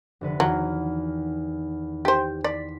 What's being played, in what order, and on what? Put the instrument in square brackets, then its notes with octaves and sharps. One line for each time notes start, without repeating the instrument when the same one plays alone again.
[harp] F1 D3 B4
[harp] E2 D#3 F6 [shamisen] F#3
[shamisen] G4 C5
[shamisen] D5 [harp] C6 B6